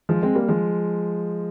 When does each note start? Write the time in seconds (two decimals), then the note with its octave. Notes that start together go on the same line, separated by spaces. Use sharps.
0.09 F3 G#3
0.23 G#3 C4
0.35 G3 A#3
0.48 F3 G#3